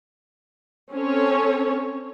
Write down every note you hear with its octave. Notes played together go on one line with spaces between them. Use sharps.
C4 C#4 A4 C#5